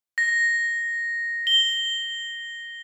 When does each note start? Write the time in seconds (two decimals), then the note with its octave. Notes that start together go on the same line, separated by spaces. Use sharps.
0.18 A#6
1.47 G7